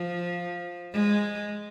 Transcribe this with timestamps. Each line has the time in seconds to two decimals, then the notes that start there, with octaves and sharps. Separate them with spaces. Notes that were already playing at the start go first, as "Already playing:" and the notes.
Already playing: F3
0.93 G#3